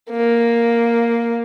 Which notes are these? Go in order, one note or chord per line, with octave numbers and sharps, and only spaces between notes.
A#3